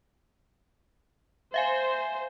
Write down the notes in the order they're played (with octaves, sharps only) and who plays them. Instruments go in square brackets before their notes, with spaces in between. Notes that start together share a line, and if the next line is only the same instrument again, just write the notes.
[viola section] C5 [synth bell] E5 F5 G#5